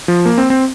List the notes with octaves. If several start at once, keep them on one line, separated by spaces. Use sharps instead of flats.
F3
A#3
C4
C4